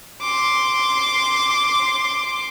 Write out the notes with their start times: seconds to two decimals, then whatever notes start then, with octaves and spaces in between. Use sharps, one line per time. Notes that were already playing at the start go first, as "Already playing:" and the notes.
0.22 C6 D6